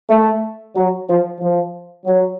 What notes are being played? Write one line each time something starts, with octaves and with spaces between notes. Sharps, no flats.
A3
F#3
F3
F3
F#3